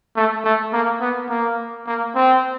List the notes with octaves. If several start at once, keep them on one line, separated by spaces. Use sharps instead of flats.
A3
A3
A#3
B3
A#3
A#3
C4